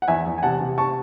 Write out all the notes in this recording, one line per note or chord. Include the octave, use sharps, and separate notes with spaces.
F#5
E2 E5 G#5
E2
G#5
C3 F#5 A5
C3
A5 C#6